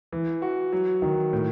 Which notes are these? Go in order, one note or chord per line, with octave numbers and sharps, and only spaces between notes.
E3
F#4
F#3
D#3
A2